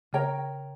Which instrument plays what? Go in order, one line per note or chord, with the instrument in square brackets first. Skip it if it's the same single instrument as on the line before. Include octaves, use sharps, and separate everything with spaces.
[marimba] C#3 [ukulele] A#4 C#5 G5 A#5